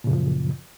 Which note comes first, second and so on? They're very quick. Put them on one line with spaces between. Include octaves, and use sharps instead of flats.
A#2 C#3 F#2 F3